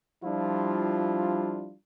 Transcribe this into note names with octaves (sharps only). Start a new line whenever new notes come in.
F3 G3 D4 E4 F4